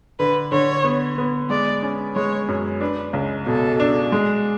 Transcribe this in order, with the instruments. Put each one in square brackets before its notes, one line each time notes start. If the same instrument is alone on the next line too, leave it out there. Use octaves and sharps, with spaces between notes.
[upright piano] D3 [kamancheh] B4
[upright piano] D3 [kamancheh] C#5
[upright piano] B3
B3
[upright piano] G#3 [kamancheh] D5
[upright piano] C#4
[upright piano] G#3 [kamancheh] C#5
[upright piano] F#2
[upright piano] D4 [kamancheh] B4
[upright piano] C#2
[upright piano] B2 [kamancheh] A4
[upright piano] D4
G#3